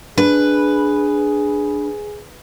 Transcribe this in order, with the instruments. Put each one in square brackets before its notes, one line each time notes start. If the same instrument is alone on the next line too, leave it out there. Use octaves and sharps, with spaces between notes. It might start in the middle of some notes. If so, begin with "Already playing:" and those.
[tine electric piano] D4 [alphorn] G#4 [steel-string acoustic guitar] B4